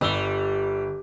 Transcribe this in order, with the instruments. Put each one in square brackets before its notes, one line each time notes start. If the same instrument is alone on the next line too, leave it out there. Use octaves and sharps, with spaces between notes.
[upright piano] G1 E6 G7 [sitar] G3